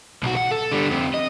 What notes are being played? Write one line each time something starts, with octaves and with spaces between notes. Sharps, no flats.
B1 F#4
F#5
A4
D3 G3
F2 C3
D#5